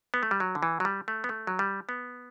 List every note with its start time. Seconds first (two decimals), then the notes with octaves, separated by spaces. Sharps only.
0.14 B3
0.23 A3
0.31 G3
0.40 F#3
0.55 D3
0.63 E3
0.80 F#3
0.85 G3
1.08 A3
1.24 B3
1.29 A3
1.47 F#3
1.59 G3
1.89 B3